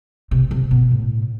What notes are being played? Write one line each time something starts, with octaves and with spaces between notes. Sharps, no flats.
C3
C3
B2
A2